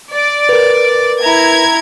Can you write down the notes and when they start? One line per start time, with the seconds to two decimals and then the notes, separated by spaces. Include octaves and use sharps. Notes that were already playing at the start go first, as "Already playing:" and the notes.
0.13 D5
0.49 A#4 B4
1.20 E4 A#5 G#6